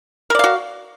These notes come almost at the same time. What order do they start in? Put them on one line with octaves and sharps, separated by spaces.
A#4 D5 F5 F#4